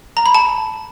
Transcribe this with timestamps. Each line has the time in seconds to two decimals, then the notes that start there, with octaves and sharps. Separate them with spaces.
0.17 A#5
0.26 B5
0.35 A5